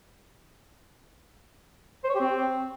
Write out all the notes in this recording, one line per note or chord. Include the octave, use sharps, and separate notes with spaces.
C5
C#5
G4
C4